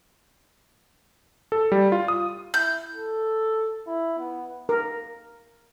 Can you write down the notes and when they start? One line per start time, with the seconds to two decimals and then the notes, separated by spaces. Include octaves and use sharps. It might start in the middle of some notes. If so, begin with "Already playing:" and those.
1.52 A4
1.72 G3
1.92 F4
2.08 D#6
2.54 E4 G6
2.95 A4
3.87 E4
4.19 B3
4.69 A#4